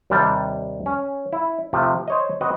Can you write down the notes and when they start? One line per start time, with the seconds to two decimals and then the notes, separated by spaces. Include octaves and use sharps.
0.10 D#2 C3 G3 D4 G4 A5
0.86 C#4
1.33 E4
1.73 C3 F3 A3
2.08 C5 C#5 D#5
2.41 C4 F#4 B4 D#5